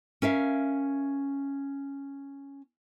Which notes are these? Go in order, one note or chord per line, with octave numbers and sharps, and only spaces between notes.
C#4 A#4 E5 F5